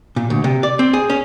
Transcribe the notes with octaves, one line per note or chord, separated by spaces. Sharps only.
A#2
D2
C3
D5
C4
G#4
C#4